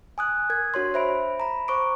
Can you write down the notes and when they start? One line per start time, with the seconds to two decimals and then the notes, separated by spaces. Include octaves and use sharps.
0.18 G#5 D#6 F#6
0.50 A#4 G#6
0.74 D4 F#4 C#5 C6
0.94 C5 E5 B5 D7
1.40 A#5 B5
1.68 C5 C#6 D6 D7